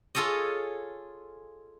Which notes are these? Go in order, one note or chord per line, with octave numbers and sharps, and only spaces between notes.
F4 G#4 A4 C#5 D#5